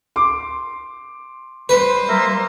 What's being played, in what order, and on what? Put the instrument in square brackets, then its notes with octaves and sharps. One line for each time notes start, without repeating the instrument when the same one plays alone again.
[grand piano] C6 D6
[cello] G3 C5 [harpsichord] B4
[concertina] A#3 A#4 E5